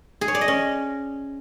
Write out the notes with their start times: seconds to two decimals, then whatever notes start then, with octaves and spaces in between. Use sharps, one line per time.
0.21 G#4
0.28 C#5
0.35 D5
0.41 D#5
0.48 C#4